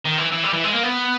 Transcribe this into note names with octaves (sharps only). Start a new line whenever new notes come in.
D#3
E3
E3
G3
E3
G#3
A#3
B3